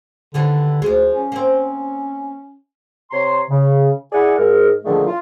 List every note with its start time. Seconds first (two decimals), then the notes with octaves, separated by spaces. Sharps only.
0.34 D#2 D3 E3 G3
0.82 D2 F3 G#3
1.13 C#4
1.32 A#3 C4
3.11 C3 C#5 A#5 C6
3.49 C#3
4.12 E4 G#4 D5 F#5 G#5
4.37 G#2 A#4
4.84 A#2 D3 D#3 F3 A3 G#4
5.06 F4